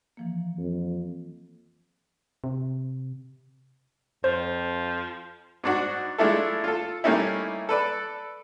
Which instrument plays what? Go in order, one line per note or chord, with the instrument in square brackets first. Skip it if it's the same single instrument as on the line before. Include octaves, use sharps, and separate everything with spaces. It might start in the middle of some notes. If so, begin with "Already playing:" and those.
[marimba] E3 F3 A#3
[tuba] F2
[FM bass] C3
[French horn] F2 [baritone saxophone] F3 [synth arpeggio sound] C5
[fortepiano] G#2 D4 F#4
G#3 A3 D4 E4 F4 A4
F4 A4
G3 A3 A#3 C#4 D#4 E4
A4 B4 D5